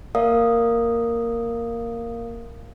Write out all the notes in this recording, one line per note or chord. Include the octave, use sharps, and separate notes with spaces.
A#3 A#4 D5 E5 F5 D#6